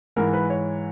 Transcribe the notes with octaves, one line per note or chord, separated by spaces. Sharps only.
G#2 E3 A#4
B4
C#5